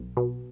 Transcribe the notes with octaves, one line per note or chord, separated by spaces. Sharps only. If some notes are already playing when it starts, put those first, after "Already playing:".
Already playing: B1
B2